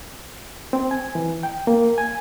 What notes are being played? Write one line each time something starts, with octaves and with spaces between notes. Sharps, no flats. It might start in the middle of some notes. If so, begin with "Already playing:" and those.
C4
G#5
E3
G5
A#3
G#5